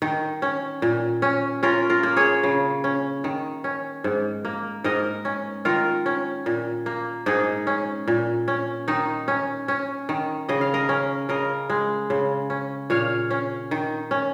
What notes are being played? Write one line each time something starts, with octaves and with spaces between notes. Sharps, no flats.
D#3
C#4
A#2
C#4
C#4 F4 A#4
F4 A#4
A#3
G#4 C#5
C#3
C#4
D#3
C#4
G#2
A#3
G#2 A#4 D#5
C#4
D#3 F4 A#4
C#4
A#2
A#3
G#2 D#4 G#4
C#4
A#2
C#4
D#3 D#4
C#4
C#4
D#3
C#3 D#5
F5
A#4 D#5
C#4
C#3 A#4 D#5
G#3
C#3
C#4
A#2 C#5 F5
C#4
D#3
C#4